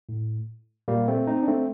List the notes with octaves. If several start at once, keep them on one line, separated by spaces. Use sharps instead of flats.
A2
A#2 G3 A#3
A3 C4
C4 D#4
D4
A3 C4